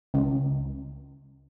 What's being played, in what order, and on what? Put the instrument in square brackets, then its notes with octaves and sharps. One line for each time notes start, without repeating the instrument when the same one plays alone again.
[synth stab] C#2